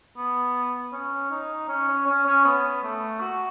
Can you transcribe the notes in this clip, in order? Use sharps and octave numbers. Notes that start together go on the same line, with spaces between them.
B3
C#4
D#4
C#4
C#4
C#4
C#4
B3
A3
F#4